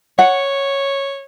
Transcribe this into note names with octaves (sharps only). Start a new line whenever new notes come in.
C#5 F#5